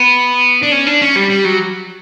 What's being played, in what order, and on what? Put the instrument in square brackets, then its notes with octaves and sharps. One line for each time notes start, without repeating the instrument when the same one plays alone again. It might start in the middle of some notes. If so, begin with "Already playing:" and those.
Already playing: [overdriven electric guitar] B3
D4
C#4
D4
C#4
G3
G3
F#3